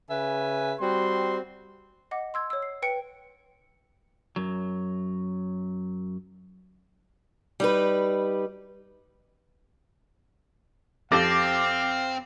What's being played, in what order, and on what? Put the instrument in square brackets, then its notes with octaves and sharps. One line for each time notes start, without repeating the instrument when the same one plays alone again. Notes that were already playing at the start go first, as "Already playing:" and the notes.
[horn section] C#3 B4 E5 G#5
G3 C4 F#4 C6
[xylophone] D#5 F#5 D6
C6 E6 G#6
C#5 E6
C7
B4 G5 C#7
[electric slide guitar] F#2 F#3
[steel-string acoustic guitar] G3 D#4 B4
[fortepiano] F2 G4 [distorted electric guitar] C4 [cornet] F5 [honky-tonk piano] D6 A6 A#6